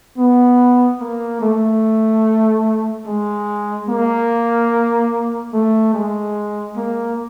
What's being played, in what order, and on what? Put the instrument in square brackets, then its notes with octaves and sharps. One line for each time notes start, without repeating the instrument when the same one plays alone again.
[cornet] B3
A#3
A3
G#3
A#3
A3
G#3
A#3